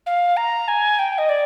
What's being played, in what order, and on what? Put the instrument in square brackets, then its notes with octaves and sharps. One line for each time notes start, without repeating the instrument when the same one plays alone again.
[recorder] F5
A#5
G#5
G5
D#5
D5